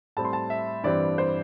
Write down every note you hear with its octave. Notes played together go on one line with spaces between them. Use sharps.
A2 G3 C4 A5
C6
A5
E5
G2 E3 G3 C4 D5
C5